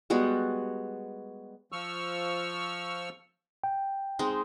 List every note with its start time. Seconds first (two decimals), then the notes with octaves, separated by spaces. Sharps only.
0.10 G3 G#3 B3 F#4
1.72 F3 C#6 E6 F6
3.64 G5
4.19 G#3 C4 D#4